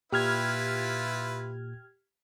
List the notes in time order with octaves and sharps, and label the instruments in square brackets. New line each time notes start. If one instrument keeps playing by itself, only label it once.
[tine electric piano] A#2 [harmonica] E4 F4 B4 [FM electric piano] G4 F6 G#6